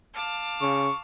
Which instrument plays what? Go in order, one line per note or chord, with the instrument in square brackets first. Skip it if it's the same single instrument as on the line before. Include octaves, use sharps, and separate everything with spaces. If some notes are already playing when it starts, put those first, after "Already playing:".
[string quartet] F5 A5 D6
[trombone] C#3 [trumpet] C#6